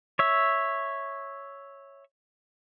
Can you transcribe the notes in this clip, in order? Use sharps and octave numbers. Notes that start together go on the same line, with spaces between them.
C#5 E5